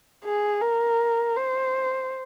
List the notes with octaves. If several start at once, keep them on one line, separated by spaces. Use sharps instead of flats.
G#4
A#4
C5